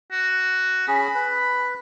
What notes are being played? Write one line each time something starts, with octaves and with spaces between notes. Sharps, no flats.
F#4
C#4 G#4 B5
B4